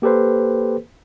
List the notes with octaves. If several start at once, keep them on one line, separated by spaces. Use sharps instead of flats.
A#3 G4 A4 B4 C5